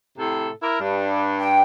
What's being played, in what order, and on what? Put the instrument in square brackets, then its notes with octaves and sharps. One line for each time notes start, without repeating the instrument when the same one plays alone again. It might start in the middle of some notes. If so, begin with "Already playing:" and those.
[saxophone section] A2 C3 A4
E4 A#4
G2
[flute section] G5